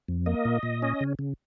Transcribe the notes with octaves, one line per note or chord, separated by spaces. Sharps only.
F2
A#3 D#5
A#2
A#2
C#4
C#3
C#3